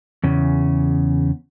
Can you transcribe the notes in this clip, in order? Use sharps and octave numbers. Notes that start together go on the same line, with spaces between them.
E2 C#3